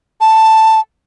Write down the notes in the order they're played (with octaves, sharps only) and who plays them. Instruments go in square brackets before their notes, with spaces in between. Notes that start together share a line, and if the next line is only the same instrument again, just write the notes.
[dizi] A5